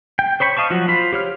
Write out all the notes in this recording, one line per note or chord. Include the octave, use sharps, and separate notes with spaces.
G5
C5 C#5 B5 C#6
D#5 F5 A5 C#6
F3 F#3 F#4
F4 C5 B5
G4 C#5 F6